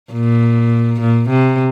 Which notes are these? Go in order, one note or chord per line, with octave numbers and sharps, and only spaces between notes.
A#2
A#2
C3